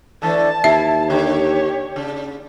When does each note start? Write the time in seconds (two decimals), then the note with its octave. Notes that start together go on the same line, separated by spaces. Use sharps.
0.22 D3 E3 A3 A5
0.64 D#2 E4 E5
1.10 D3 G4 C#5
1.96 C#3